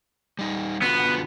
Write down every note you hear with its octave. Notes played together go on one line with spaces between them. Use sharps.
G3 D#4
D3 B3 F4 F#4